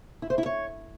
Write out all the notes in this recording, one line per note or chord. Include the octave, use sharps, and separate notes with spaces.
E4
C5
E4
C#5